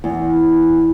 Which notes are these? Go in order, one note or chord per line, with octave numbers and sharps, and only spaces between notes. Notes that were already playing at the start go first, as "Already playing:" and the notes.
E2